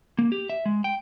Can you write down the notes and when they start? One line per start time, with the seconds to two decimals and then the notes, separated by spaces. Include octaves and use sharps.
0.19 A#3
0.32 G4
0.50 E5
0.66 G#3
0.84 G5